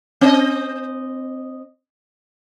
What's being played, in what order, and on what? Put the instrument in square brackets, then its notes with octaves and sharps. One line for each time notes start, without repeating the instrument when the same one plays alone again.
[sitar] C4 D#5